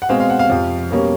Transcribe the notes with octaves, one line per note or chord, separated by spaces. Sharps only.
F#5
B2 G#3 C4 F5
F5
F#5
F5
F2 C3 F3
B2 G3 A#3 C#4